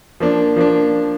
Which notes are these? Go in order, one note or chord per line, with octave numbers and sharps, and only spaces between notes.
F3 A#3 D4
F3 A#3 D4